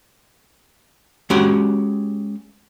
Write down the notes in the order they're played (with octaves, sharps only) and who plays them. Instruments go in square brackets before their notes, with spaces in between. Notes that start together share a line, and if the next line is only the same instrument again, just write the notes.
[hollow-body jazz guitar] G#3 C#4 F#4 G4 F#5